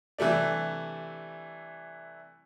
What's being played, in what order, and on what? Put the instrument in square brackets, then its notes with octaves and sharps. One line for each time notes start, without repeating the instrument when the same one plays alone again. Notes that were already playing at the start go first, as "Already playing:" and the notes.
[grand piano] C3 E3 G3 A3 D4